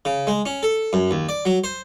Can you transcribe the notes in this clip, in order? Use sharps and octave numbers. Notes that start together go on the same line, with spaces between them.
C#3
G#3
C#4
A4
F#2
D#2
D5
F#3
C5